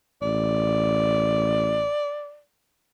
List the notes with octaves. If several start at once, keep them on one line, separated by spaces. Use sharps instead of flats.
A1 D5